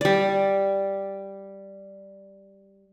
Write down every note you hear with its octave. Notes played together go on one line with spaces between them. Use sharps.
G3 D5